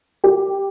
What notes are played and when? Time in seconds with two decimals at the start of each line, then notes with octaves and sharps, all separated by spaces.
0.24 G4